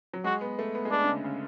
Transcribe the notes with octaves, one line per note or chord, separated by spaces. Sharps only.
F#3
G#3 F#4
B3
A3
B3
G#3
A3 D4
D3
C#3
C#3